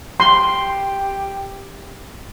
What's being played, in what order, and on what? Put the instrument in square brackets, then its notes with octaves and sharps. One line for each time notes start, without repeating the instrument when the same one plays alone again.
[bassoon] G4 [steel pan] C6